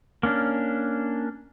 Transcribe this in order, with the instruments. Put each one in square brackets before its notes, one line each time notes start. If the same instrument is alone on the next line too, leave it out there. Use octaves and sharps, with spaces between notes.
[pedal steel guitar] A#3 C#4 D4